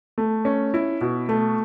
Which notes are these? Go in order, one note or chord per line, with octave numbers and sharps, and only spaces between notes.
A3
C#4
E4
B2
A3